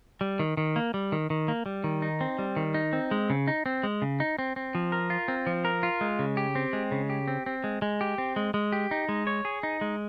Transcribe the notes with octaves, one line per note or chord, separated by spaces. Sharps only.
G3
D#3
D#3
A#3
G3
D#3
D#3
A#3
G3
D#3
D#4
C4
G3
D#3
D#4
C4
G#3
C#3
D#4
C4
G#3
C#3
D#4
C4
C4
F3
A#4
F4
C4
F3
A#4
F4
G#3
C#3
G4
C4
G#3
C#3
G4
C4
C4
G#3
G#3
G4
C4
G#3
G#3
G4
D#4
G#3
C#5
G#4
D#4
G#3